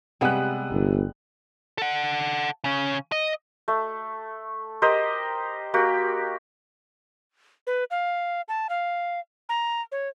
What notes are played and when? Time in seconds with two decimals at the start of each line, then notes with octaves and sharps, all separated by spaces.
0.21 C3 G3 G#3 B3 F#6
0.72 G1
1.78 A4 F#5
2.64 C#3 C#4
3.12 D#5
3.68 A3
4.82 G4 A#4 C5 D#5
5.74 A#3 F#4 G4
7.67 B4
7.91 F5
8.48 A5
8.69 F5
9.49 A#5
9.92 C#5